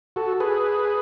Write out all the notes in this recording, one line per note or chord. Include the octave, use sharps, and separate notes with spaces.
F#4 A4
G#4 B4